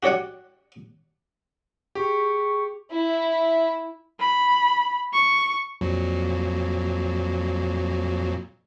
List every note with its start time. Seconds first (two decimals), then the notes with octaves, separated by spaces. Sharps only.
0.03 F#4 G4 C#5 D5 F#5
1.95 G4 G#4 C#6
2.91 E4
4.19 B5
5.13 C#6
5.81 F2 A#2 F#3